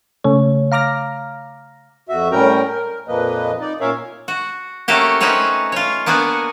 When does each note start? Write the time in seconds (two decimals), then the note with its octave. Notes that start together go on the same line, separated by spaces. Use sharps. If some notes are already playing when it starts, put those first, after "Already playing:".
0.24 C#3 A3 C#5
0.72 F5 A#5 D6 F6 A#6
2.09 F2 F#4 E5
2.32 A2 G3 C#4 A#4 G5 A#5
2.68 A#4
3.08 F2 A#2 F3 A#3 B4 D#5
3.61 D#4 D5
3.80 A#2 C#4 A#4 C#5 E5 F5
4.28 F#4
4.88 A3 A#3 C#4 F#4 G4
5.21 C4 C#4 D#4 F#4 B4 C#5
5.72 F4 C#5
6.06 A#3 B3 D4 F#4 G#5